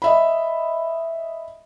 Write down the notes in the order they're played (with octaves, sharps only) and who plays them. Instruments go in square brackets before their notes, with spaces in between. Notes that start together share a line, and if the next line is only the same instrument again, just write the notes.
[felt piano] D#5 E5 B5